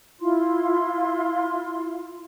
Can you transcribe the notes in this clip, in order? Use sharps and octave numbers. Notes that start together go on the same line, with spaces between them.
E4 F4 C6